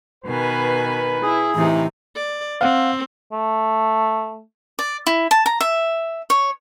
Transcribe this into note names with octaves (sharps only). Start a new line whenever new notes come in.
B2 D#3 B4 G#5
E4 G#4
A2 C3 E3 D#4
D5
C4 F5 F#5
A3
D5
E4
A5
A#5
E5
C#5